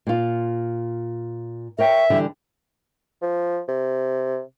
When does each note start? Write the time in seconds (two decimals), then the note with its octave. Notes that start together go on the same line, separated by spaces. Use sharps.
0.07 A#2 F4
1.79 A#4 C#5 E5 G5
2.10 D3 E3 G3
3.22 F3
3.69 C3